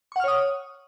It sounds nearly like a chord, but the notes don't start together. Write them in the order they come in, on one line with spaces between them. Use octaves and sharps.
C#6 F#5 F6 C#5 D#6